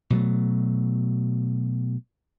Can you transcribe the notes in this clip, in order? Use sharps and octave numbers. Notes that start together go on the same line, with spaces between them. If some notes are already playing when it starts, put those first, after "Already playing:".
B2 F#3 A3